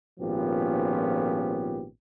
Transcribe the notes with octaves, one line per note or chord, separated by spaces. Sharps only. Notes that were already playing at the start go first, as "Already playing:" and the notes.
G#1 A#2 F3 B3 C#4 G4